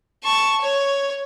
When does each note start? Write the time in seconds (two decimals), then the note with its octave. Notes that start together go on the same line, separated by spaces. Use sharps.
0.24 A5 C#6
0.61 C#5